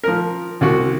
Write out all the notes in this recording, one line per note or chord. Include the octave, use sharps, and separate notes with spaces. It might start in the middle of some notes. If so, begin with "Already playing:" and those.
F3 A#4
C2 F#4